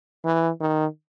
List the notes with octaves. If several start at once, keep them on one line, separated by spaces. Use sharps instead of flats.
E3
D#3